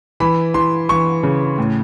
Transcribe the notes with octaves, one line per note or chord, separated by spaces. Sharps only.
E3 B5
E3 C6
E3 C#6
C#3
A2